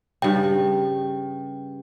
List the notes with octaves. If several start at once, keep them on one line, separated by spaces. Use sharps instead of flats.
G2 C#3 G5